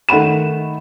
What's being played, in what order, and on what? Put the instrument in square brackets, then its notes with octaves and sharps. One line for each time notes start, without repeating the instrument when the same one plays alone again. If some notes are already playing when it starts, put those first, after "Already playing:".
[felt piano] D#3 A3 F#5 B5 E7